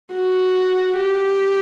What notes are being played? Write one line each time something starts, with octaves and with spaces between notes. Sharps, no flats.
F#4
G4